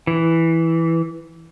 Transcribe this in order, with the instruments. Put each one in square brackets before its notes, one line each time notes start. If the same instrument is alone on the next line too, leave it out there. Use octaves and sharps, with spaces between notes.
[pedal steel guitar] E3